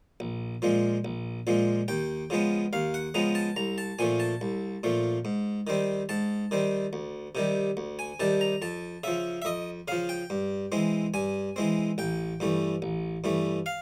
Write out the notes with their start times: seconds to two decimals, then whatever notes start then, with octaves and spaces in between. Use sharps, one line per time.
0.20 A#1
0.62 A#2 F3 G#3
1.05 A#1
1.47 A#2 F3 G#3
1.88 D#2 G5
2.30 C#3 F3 G#3 B3
2.73 D#2 F5
2.94 F#5
3.14 C#3 F3 G#3 B3 A#5
3.35 A5
3.56 C2 A#5
3.78 A5
3.99 A#2 F3 A3 G#5
4.20 A5
4.41 C2
4.83 A#2 F3 A3
5.25 G#2
5.67 D#3 G3 C4
6.09 G#2 A5
6.51 D#3 G3 C4
6.93 D2
7.35 C3 D#3 G3
7.77 D2
7.99 G#5
8.20 C3 D#3 G3 A5
8.41 A#5
8.62 F2 A5
9.04 C#3 F3 E5
9.42 E5
9.45 F2 D#5
9.88 C#3 F3 F5
10.09 G5
10.30 G2
10.72 E3 G#3 C4
11.14 G2 G#5
11.56 E3 G#3 C4
11.98 A1 G5
12.40 G2 E3 A3
12.82 A1
13.24 G2 E3 A3
13.66 F5